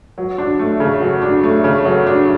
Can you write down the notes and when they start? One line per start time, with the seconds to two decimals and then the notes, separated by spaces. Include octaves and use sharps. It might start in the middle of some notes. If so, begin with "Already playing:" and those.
0.18 F#3
0.38 D4
0.59 A3
0.80 C#3
1.01 F#3
1.22 D4
1.43 A3
1.64 C#3
1.85 F#3
2.07 D4